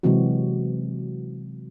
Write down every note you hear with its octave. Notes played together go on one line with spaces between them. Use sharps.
C3 E3 F#3 G#3 C4 F#4